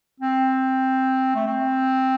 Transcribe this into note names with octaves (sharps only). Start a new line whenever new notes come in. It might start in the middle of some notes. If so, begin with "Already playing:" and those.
C4
A3
C4